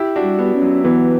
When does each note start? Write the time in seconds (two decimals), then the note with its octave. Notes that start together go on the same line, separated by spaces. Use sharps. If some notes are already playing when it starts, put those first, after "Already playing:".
Already playing: E4 G4
0.16 D4 F#4
0.23 G3
0.39 B3 D4
0.54 C#4
0.62 F#3
0.84 E3 B3